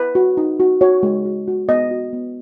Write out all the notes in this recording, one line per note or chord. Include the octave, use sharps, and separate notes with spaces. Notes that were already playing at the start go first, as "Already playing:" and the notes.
Already playing: B4
F#4
D#4
F#4
F#4 C#5
G#3
F#4
F#4
B3 D#5
F#4
B3